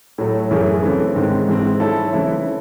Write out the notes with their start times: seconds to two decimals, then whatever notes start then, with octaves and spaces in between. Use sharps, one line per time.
0.18 A2 F#3 A3
0.51 F#2 E3 A3 C#4 G#4
0.83 C#3 E3 A3 C4
1.16 G#2 D#3 G#3 C4
1.48 G#2 E3 G#3 C4
1.80 F#3 C#4 E4 A4
2.13 C#3 E3 A3 C4 E4